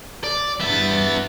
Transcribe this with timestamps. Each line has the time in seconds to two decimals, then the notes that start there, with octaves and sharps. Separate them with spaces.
0.24 D5
0.60 G2 B3 E5 A6